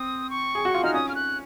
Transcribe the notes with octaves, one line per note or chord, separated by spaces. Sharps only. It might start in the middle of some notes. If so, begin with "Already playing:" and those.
Already playing: C4 D#6
C#6
G#4
F#4
F4
D#4 F6
C#4 D#6
F6
F#6